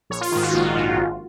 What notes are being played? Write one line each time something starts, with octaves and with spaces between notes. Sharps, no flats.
A#1 C#5
F4
G#2 D#3 F4
F#4
A#1
G#2 D#3
G#1